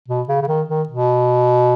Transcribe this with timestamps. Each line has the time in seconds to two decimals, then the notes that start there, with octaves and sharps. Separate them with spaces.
0.08 B2
0.28 C#3
0.41 C#3
0.47 D#3
0.68 D#3
0.88 B2